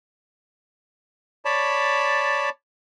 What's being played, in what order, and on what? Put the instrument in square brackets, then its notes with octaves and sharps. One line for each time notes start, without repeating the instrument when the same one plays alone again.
[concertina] C#5 D5 A5 B5